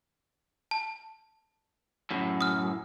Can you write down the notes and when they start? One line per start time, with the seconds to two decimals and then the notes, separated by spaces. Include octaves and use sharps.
0.71 A5
2.11 F#2 A2
2.41 D#6 F6